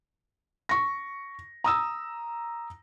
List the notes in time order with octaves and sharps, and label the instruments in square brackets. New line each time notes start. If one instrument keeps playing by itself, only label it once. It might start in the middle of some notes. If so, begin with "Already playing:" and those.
[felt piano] C#6 A#6
A#5 D#6 E6